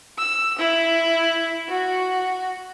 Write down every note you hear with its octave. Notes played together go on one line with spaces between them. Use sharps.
E6
E4
F#4